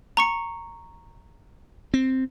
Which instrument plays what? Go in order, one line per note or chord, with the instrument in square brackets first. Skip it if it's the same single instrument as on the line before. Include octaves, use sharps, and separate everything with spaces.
[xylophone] A#5 C#6 C#7
[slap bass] C4